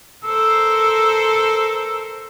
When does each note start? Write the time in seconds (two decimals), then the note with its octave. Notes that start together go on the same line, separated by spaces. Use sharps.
0.24 A4 A#4 C5 E6